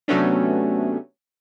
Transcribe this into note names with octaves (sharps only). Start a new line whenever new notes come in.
C3 F#3 A3 B3 C#4 D4